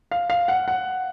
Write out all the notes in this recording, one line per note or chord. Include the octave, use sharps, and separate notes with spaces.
F5
F5
F#5
F#5